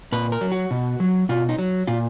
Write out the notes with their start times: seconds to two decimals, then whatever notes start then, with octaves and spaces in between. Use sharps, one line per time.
0.12 A#2 B4
0.32 A#4
0.41 F#3
0.52 F#4
0.71 B2
1.00 F#3
1.29 B2 F4
1.49 D#4
1.59 F#3
1.87 A#2 F4